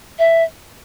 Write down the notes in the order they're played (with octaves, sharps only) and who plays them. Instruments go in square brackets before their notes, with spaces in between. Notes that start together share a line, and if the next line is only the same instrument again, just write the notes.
[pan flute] E5